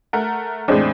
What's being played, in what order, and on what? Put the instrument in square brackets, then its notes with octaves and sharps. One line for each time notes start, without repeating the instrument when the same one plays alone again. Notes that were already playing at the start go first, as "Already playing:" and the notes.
[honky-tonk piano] A3 A#4 F#5
[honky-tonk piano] E2 A2 [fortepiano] G#3 C4 D4